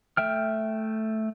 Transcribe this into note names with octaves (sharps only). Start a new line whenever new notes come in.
A3 E5 G5 F6